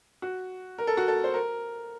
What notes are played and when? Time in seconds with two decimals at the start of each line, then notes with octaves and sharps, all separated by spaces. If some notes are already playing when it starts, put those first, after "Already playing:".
0.22 F#4
0.78 A#4
0.87 A4
0.97 F#4
1.08 A4
1.24 C5
1.34 A#4